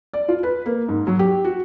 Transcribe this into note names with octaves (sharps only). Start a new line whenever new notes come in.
D5
F4
B4
A#3
G#2
F#3
G4
F#4